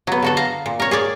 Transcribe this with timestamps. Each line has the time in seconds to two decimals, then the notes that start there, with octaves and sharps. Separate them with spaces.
0.07 F#3 B3
0.22 D3 F#4 A4
0.37 F5 A#5
0.66 A#2
0.80 A#4 C#5
0.91 G#4 C#5 D5